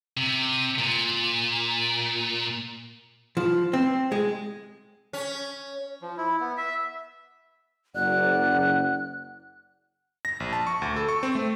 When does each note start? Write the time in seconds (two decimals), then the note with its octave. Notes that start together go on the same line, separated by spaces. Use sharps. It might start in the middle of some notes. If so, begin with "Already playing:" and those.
0.17 C3
0.78 A#2
3.37 F3
3.73 C4
4.12 G#3
5.13 C#4
6.02 F3
6.17 E4
6.40 B3
6.57 E5
7.95 F#1 F#2 D5 F#5 F#6
10.25 A#6
10.40 A#1
10.53 A5
10.67 C#6
10.82 D2
10.96 A4
11.08 C#6
11.23 C4
11.35 A3